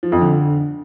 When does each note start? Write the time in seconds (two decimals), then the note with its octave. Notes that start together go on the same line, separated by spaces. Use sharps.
0.03 F3
0.12 F2
0.21 D3